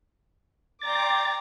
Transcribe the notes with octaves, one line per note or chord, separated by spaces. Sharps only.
D5 G5 A#5 C6 D6 A6